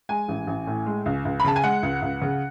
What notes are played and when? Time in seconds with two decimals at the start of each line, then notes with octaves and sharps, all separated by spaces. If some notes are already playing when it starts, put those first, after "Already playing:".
0.09 G#3 G#5
0.28 A1
0.47 A1
0.67 A2
0.86 G#3
1.06 C#2
1.25 C#2
1.40 B5
1.44 C#3 A5
1.56 G#5
1.63 G#3 F#5
1.83 C#2
2.02 C#2
2.22 C#3